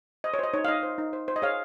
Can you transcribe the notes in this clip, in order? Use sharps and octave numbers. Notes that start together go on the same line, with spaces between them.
C5 D#5
C#5
C5 D#5
D#4 C#5
F5
D#4 D#5
C5
D#4
C5
C5
D#5
G#4 C#5 F5